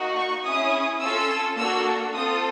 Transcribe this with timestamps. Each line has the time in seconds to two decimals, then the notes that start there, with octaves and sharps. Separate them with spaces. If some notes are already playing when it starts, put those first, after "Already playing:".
Already playing: A#3 D#4 F#4
0.16 C#6
0.43 C#4 E4 G#4 D#6
1.00 C#4 F4 A4 E6
1.57 A#3 D4 F#4 A4 E6
2.14 C4 F4 A4 D#6